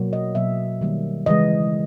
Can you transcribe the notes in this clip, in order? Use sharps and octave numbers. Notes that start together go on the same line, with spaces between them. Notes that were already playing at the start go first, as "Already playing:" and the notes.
Already playing: B2 F#3 A#3
D#5
B2 F#3 A#3 E5
D#3 G3 A#3
C#3 E3 G#3 D#5